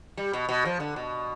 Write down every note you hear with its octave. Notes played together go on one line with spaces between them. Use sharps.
G3
B2
B2
F3
D3
B2